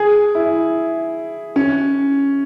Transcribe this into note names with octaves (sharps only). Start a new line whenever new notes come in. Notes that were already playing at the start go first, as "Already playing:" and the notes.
Already playing: G#4
E4
C#4